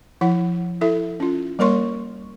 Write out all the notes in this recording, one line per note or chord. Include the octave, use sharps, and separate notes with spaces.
F3 E4 F#5
E4 A4 E5
C#4 F4
G3 A#3 A#4 C#5 C6 C#6